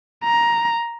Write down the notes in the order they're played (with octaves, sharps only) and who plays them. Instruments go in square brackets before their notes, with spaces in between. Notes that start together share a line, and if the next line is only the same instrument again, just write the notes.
[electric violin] A#5